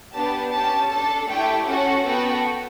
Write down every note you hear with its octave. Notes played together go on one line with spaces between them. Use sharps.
B3 D4 G4 A5
C#4 G4 A5
D4 A4 A5
A3 E4 G4 G5
C#4 F#4 A4 F#5
B3 F#4 A4 G5